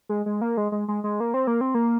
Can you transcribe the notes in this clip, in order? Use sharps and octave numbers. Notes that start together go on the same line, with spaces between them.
G#3
G#3
A#3
G#3
G#3
G#3
G#3
A#3
C4
A#3
C4
A#3